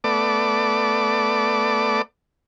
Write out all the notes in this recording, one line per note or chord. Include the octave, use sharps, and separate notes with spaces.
A3 B3 D5 D6